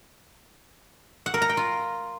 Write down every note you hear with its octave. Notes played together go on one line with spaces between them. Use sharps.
F#5
A#4
A#5
G5
F4